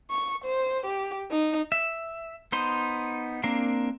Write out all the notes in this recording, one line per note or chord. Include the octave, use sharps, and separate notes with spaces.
C#6
C5
G4
D#4
E5
B3 D#4 C5 C6
A#3 C4 D4 A#4 F5